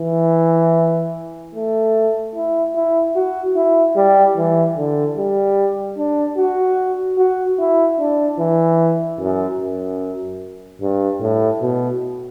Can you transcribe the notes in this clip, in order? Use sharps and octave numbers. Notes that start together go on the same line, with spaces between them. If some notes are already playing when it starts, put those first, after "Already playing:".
Already playing: E3
A3
E4
E4
F#4
E4
G3
E3
D3
G3
D4
F#4
F#4
E4
D4
E3
F#2
F#2
G2
A2
B2